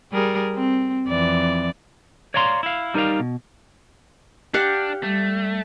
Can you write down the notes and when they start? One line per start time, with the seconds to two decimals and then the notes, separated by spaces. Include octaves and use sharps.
0.12 G3 G#4 A#4
0.55 C4
1.08 F2 E3 D5
2.34 C#5 D5 F5 A#5 C6
2.63 E4 F5
2.94 G3 D#4 A#4 D5 F5
3.20 B2
4.54 D4 G4 F5 F#5
5.03 G3 A3